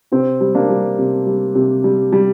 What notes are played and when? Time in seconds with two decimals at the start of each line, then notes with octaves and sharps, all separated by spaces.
0.12 C3 C4
0.41 G3
0.55 A#3 D4
0.69 G3
0.99 C3
1.26 G3
1.55 C3
1.84 G3
2.13 G3